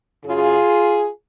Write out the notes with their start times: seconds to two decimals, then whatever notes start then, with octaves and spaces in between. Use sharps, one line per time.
0.24 F#2 C#3 F#3 F4 G#4